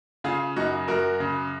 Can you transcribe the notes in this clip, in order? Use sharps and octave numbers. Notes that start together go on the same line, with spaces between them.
C#3 F4 G#4
F#2 D#4 F#4
F#2 F#4 A#4
C#3